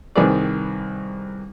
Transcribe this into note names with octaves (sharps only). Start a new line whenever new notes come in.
C2 D#3 C4 G#4 B4 D5